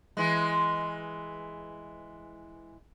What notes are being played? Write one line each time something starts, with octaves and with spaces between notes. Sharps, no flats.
E3 G#3